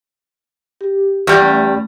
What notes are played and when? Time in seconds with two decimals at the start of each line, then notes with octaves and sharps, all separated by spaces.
0.81 G4
1.27 E2 G3 G4 C#6
1.40 A3 C#4